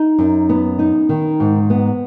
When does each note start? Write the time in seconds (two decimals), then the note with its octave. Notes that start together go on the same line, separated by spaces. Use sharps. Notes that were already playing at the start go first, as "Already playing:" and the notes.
Already playing: D#4
0.18 F#2
0.49 B3
0.79 D#4
1.09 D#3
1.40 G#2
1.70 B3